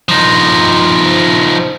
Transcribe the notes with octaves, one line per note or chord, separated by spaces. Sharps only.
F3 D#4